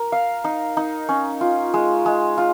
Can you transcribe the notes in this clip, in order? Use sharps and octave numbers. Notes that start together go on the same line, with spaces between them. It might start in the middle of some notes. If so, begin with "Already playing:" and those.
Already playing: A#4
F5
D#4
D#4
C#4
F4
G#3
G#3
F4